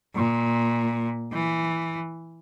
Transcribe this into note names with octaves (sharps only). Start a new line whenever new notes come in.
A#2
E3